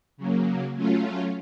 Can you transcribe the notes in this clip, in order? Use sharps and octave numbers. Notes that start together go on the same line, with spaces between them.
C#3 F#3 A#3
F#3 A3 C#4 F4